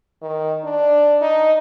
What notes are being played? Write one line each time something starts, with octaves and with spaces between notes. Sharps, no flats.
D#3
D4
D#4